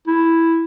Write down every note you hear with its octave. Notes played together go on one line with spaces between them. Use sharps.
E4